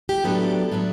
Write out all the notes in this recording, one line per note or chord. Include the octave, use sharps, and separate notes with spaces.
G4
A2 F#3 B3 D4 A4
A2 F#3 B3 D4